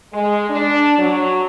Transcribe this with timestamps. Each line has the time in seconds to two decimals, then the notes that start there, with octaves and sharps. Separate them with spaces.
0.13 G#3
0.50 D4
0.99 F#3